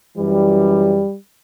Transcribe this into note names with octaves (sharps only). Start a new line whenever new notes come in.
F#2 E3 G3